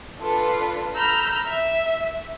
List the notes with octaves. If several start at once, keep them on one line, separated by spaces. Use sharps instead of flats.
D4 F4 A4 B4
A#5 B5 E6 F6 G6
E5